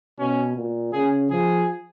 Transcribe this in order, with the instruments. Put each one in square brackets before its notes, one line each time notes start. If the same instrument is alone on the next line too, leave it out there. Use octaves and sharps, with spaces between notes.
[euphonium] B2 [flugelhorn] C#4
[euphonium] A#2
[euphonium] C#3 [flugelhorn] G#4
[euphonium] F3 [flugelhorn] G#4